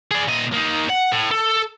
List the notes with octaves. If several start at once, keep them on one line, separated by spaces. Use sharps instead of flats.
G#4 D5
A#2 D#5
A#3 D#4
F#5
A2
A4